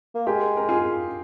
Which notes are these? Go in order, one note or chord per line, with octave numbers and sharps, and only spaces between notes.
A#3
G#3 G4 A#4
A#4
F4 G#4